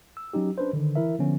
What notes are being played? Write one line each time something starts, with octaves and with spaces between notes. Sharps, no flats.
E6
F#3 C#4 D#4 G4
C#4 D4 B4 C5
D3 D#3
E3 E4 A#4 E5
D3 F3 B3 C#4